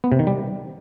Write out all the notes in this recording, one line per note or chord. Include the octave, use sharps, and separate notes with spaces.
B3
C3
D#3
G3